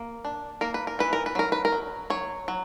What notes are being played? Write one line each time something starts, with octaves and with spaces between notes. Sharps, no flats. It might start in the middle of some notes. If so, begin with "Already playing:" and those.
Already playing: A#3
D4
A#3 A#4
B4
A#4
E3 B4
A#4
B4
F#3 A#4
B4
A#4
F#3
F#3 C#5
F#3